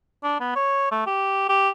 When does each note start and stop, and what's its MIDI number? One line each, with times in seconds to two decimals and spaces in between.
0.23 0.35 62
0.40 0.51 59
0.56 0.89 73
0.91 1.02 57
1.07 1.47 67
1.49 1.69 67